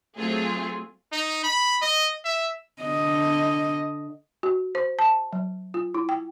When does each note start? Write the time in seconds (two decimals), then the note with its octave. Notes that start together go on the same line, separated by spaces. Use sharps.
0.18 F#3 A3 C4 F4 G#4
1.12 D#4
1.44 B5
1.82 D#5
2.25 E5
2.83 D3 D#5
4.43 F#4
4.75 C5
4.99 A5
5.33 F#3
5.74 F4
5.94 E4
6.09 G5